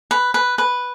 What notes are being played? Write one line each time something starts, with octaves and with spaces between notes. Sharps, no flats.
B4
B4
B4